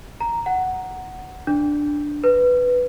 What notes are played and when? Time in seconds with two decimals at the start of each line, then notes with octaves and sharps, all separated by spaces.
0.20 A#5
0.46 F#5
1.47 D4
2.24 B4